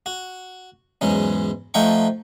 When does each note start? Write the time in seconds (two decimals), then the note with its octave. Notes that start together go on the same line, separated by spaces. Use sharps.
0.06 F#4
1.01 E2 G#2 F#3 C#4
1.74 F3 A3 D#4 F#5 G5 C#6